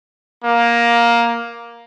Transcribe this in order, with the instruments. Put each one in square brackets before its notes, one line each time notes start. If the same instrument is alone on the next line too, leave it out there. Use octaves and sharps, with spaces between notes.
[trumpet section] A#3